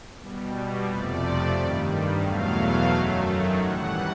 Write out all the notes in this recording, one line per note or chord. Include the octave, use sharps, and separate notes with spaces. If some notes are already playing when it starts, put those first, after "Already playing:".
B2 G3
F2 C3 F3 A3 D5
G2 D#3 G3
E2 B2 F#3 A3 F5
F#2 D#3 F#3 A3
A2 E3 G3 F#5